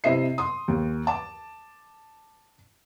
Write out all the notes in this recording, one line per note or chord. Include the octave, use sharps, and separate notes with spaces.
C3 E4 D#5 E5 C7
C6 D#6
D#2
A5 D6